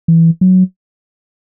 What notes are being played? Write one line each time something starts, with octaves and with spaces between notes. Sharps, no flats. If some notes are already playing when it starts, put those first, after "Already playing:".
E3
F#3